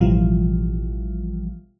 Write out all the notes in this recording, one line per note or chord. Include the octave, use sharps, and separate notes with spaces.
A1 B2 E3 F3 G3 F4